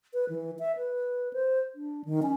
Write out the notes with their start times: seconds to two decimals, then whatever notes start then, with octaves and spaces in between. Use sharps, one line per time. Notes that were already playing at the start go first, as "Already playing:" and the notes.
0.14 B4
0.29 E3
0.59 E5
0.77 B4
1.33 C5
1.75 D4
2.05 D#3
2.22 C#4